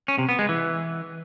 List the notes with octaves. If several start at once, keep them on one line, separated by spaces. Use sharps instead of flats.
C#4
C3
B3
G#3
E3